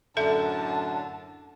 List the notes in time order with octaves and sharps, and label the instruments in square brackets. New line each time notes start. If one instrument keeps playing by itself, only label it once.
[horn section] F#2 A2 D3 [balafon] A4 E5 [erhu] A5